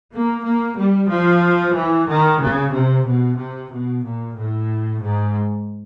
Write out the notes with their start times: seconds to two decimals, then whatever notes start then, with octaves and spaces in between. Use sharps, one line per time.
0.11 A#3
0.43 A#3
0.77 G3
1.09 F3
1.73 E3
2.07 D#3
2.39 C#3
2.72 C3
3.05 B2
3.37 C3
3.70 B2
4.02 A#2
4.36 A2
5.01 G#2